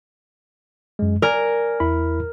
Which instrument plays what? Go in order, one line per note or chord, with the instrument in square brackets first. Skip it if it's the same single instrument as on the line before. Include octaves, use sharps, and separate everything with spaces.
[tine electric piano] F#2 G#3
[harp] A#4 [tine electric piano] D5 G#5
[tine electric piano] E2 E4 B5